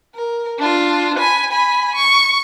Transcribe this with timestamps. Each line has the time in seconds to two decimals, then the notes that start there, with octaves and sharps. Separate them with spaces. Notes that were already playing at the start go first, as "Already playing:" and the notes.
0.15 A#4
0.59 D4 F4
1.19 G#5 B5
1.52 G#5 B5
1.95 C#6